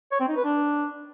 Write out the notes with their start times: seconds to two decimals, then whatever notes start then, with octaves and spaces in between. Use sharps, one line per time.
0.12 C#5
0.20 C4
0.28 D#4
0.36 B4
0.44 D4